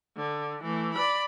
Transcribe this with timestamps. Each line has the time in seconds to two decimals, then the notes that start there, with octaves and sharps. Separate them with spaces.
0.17 D3
0.63 E3 A3
0.94 D5 B5